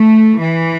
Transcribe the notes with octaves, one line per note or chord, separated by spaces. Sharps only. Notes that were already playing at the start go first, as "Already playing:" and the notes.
Already playing: A3
E3